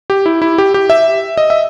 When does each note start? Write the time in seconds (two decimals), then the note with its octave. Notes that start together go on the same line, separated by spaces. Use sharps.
0.10 G4
0.26 E4
0.42 E4
0.58 G4
0.74 G4
0.90 E5
1.37 D#5
1.50 E5